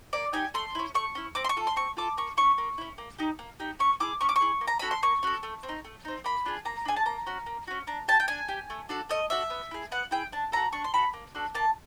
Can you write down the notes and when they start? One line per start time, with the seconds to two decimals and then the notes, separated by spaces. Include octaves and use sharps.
0.13 A#3 D5
0.33 D#4 G4 G#5
0.54 A3 C6
0.75 C#4 E4
0.94 A3 C#6
1.15 C#4 E4
1.35 C4 D6
1.44 C6
1.49 C#6
1.57 F4 A4
1.67 C6
1.76 C4 C#6
1.97 F4 A4 D6
2.17 A#3 C#6
2.37 C#4 E4 C#6
2.58 A#3
2.78 C#4 E4
2.98 A#3
3.18 D#4 G4
3.39 A#3
3.60 D#4 G4
3.79 C#4 C#6
4.00 E4 G#4 D6
4.21 C#4 C#6
4.29 D6
4.36 C#6
4.41 E4 G#4
4.61 A#3
4.67 A#5
4.79 C#4 F#4 A4 B5
4.91 C6
5.03 A#3 C#6
5.23 C#4 F#4 A4
5.43 A3
5.63 C4
5.69 D#4
5.85 A3
6.05 C4 D#4
6.24 A#3 B5
6.45 D4 F4 G#4
6.65 A#3 A#5
6.85 D4 F4 G#4 G#5
6.96 A5
7.06 A#3 A#5
7.26 C#4 F#4
7.46 A#3
7.67 C#4 F#4
7.87 D4 A#5
8.08 G4 A5
8.20 G5
8.28 D4 G#5
8.48 G4
8.70 A3
8.89 D4 F#4 A4
9.09 A3 D#5
9.30 D4 F#4 A4 E5
9.50 B3
9.71 E4 G#4
9.92 B3 F#5
10.11 E4 G#4 G5
10.32 D4 A5
10.52 F#4 A4 A#5
10.73 D4 C#6
10.84 C6
10.94 F#4 A4 B5
11.13 A#3
11.35 D4 F#4 A4
11.55 A#3 A5